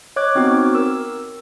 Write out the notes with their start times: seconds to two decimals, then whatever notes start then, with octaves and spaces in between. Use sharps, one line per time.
0.16 C#5 D#5 D6 F#6 G#6
0.35 B3 C4 D#4 F#4 D6
0.75 A#4 E6